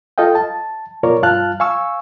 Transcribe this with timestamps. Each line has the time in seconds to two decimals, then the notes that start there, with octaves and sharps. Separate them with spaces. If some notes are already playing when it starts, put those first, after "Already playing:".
0.18 F4 A4 D#5 F5 G5
0.35 A5
1.03 B2 F4 A#4 C#5 D5
1.23 G2 F4 F5 A5 F6 F#6
1.60 F5 G#5 C#6 E6